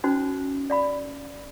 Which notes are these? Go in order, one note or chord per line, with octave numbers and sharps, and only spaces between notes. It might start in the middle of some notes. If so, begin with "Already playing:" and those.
C#4 D#4 F#4 C5
D5 F5 B5